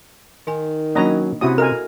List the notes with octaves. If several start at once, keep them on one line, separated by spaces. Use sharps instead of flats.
D#3 D#4 G#5
F#3 A#3 C#4 D4 D#5 A#5 C#6
C3 C#4 E4 F#4 D#6
A4 A#4 D#5 G#5